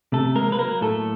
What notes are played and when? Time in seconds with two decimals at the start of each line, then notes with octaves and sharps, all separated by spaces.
0.12 C3 A3 A4
0.35 G#3 A#3 A#4
0.52 B4
0.59 F#3 A#3 A#4
0.81 A2 A3 A4